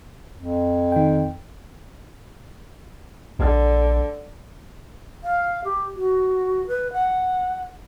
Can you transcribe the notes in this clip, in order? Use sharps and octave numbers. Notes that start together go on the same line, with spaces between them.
F2
D#3 G5
A#1 D3
F5
G4
F#4
B4
F#5